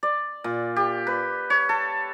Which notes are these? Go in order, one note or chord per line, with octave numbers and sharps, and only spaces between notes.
D5
A#2
G4
B4
C#5
A4